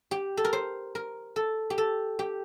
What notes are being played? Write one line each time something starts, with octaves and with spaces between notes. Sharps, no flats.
G4
A4
A#4
C5
A#4
A4
G4
A4
G4